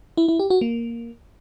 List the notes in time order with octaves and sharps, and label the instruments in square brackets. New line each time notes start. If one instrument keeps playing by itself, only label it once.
[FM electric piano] E4
E4
G4
F#4
A#3